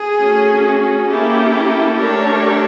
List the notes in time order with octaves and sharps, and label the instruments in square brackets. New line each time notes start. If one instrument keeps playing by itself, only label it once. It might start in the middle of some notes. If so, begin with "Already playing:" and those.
Already playing: [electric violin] G#4
[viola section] A3 C#4 F#4
[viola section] A#3 C#4 E4 G4 [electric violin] A4
[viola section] A3 D4 G4 A#4 C#5